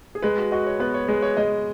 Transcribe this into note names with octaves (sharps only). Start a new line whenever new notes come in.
G#4
G#3 B4
F#4
F#4 D#5
C#5
B3 B4
C#5
G#3 C#5
C#5
G#3 D#5